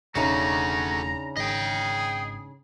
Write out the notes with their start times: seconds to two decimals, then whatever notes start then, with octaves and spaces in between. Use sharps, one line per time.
0.15 E1 C#3 A3 D4 D#4 F#4 A#5
1.37 G#1 G#4 D#5 G5